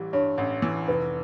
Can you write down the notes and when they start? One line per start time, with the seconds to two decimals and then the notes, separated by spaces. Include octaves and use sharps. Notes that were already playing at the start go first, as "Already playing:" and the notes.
Already playing: A1 E3 G3
0.13 G2 C#5
0.38 A1
0.62 E3
0.88 F1 B4